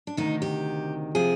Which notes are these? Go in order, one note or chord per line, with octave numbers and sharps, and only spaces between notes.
D4
D2 C3 D#3 D#4
G4
C3 F3 G#4